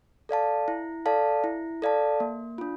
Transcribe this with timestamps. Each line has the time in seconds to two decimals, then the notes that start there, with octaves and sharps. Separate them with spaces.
0.29 A4 D5 F5 A5
0.68 E4
1.06 A4 D5 F5 A5
1.44 E4
1.82 A4 D5 F5 A5
2.20 A#3
2.58 D4 F4